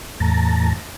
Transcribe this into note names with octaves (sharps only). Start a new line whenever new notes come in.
E2 A2 A5 A#5